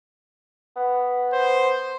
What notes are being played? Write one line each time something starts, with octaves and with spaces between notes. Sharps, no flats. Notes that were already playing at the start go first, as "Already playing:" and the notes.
B3
C5